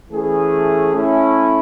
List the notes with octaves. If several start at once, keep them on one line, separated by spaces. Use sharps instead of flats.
E3 A3 C#4 G#4
A3 C#4 E4